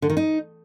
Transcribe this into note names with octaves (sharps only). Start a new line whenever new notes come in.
D3
D#3
D#4